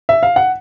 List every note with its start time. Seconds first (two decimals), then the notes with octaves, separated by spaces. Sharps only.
0.09 E5
0.23 F5
0.36 F#5